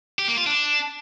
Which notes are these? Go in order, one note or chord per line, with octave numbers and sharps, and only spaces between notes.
G4
A#3
F4
D4